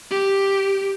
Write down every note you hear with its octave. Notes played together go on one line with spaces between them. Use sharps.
G4